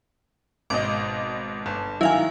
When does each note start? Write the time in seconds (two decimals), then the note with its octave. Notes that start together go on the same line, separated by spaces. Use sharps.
0.70 G#1 B2 D#5 D6
1.66 G1
2.01 D#3 F#3 E4 F5 G#5